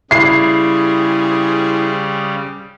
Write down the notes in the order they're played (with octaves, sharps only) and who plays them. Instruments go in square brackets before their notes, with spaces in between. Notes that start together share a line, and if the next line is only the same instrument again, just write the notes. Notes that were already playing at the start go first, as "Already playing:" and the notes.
[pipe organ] C#3 G3 [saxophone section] C4 G#4 [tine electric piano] E4 [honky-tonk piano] C7